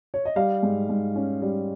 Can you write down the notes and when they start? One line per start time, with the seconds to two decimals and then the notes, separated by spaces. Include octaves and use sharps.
0.14 C#5
0.25 D#5
0.36 G3 F5
0.63 G#2
0.89 G#2
1.16 C#4
1.42 G3